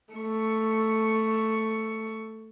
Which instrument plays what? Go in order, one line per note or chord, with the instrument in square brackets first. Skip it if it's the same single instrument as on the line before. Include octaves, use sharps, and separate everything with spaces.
[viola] A3 C#6